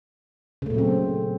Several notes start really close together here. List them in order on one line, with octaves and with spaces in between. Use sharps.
C#3 A3 A#2 F#3 C4